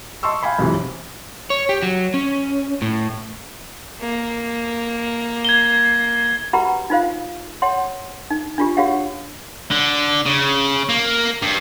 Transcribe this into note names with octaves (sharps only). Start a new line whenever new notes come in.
D#5 A5 C6 C#6 E6
F5 G5 G#5 B5
B1 F#2 C3 E3 G#3
C#5
G4
F#3
C#4
A2
A#3
G#6 G7
F#4 G4 B4 F#5 A#5 B5
D#4 F4 C5 F5
C#5 F#5 C6
D#4
D4 F4 G4
F#4 G4 C#5 F5 F#5
D3
C#3
A#3
G2